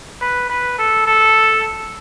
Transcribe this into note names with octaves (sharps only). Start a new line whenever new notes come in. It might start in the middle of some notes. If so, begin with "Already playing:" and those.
B4
B4
A4
A4